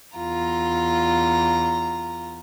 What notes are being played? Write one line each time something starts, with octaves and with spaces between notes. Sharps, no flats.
E2 F4 A#5